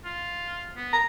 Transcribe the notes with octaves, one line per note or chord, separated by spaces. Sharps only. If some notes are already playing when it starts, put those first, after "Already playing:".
F4
B3
A#5